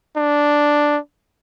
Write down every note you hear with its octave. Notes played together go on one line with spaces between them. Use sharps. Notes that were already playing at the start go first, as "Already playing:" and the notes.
D4